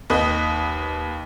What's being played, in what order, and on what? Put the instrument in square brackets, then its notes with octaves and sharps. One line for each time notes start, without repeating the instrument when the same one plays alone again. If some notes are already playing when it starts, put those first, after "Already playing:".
[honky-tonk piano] D#2 B4 D#5